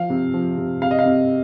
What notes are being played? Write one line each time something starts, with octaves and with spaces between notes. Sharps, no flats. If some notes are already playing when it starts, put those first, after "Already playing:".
Already playing: F3 F5
C3
F3
C3
C3 F5
D#5
F5
C3